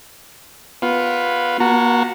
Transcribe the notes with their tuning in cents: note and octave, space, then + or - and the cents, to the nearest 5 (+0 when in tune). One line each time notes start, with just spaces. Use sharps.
B3 +0 F4 +10 B4 +0
A#3 +40 F#4 +0 A#5 -40